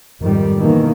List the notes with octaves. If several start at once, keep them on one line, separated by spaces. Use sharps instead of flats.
G#1 F2 D#3 G3
B2 D#3 E3 A#3